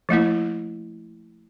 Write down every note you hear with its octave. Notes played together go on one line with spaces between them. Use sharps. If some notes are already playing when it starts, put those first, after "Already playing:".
F3 A3 A#3 E4